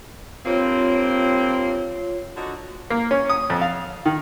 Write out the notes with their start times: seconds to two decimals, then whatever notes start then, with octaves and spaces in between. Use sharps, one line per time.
0.46 G2 A#3 C4 F4 C#5
2.36 D3 D#4 F#4
2.90 A#3
3.11 C#4
3.30 D#6
3.50 F2
3.61 F5
4.06 D#3